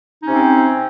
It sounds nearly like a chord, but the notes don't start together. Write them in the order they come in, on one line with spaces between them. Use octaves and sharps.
D#4 C#4 C3 C4